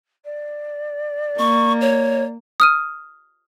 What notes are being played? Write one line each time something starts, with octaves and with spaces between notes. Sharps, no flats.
D5
A#3 C#6
C#5
D#6 F6 D#7